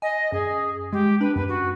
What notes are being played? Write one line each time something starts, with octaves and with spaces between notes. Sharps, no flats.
D#5 G#5
F#2 G#4
G#3 G4
D4 B4
F#2 B4
F#4